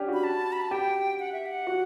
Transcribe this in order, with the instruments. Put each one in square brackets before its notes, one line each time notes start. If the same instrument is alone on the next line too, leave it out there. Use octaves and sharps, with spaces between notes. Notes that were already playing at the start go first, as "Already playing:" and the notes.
Already playing: [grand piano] C#4 D4 G4
[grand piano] F#4 [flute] B5
[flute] A5
B5
A5
[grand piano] G4 [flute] G5
[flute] F#5
E5
F#5
[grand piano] F#4